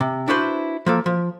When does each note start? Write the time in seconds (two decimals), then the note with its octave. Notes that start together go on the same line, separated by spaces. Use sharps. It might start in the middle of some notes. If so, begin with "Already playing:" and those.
0.01 C3
0.28 D4 E4 F#4 B4 C5
0.86 F3 A#3 A4
1.06 F3